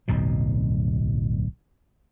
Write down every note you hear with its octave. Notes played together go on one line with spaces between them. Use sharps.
D1 B1 F2 B2